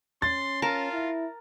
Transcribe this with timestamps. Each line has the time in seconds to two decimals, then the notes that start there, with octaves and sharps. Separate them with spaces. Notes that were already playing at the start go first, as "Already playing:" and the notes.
0.22 C#4 C6 A6
0.62 F4 A#4 A5
0.92 E4